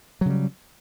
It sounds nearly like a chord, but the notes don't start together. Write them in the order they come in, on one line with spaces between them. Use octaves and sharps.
F#3 C#3 G3